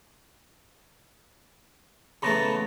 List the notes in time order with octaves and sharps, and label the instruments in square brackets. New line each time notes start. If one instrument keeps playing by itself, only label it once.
[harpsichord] C#3 E3 A3 [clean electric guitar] B3 A5 A#5